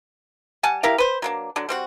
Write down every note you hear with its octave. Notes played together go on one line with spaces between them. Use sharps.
G3 F#5 G#5 A5
E4 G4 A#4 F5
B4 C5
F#3 A#3 D4
D3 F#3 D4
G3 C4 F#4